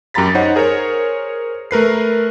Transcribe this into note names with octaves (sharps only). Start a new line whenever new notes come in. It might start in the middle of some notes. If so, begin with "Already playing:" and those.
F#2 G4 A#5 B5 A6 B6
D#4 C5 C#5 F#5
G#4 A#4 C5 C#5
A3 A#4 B4 C7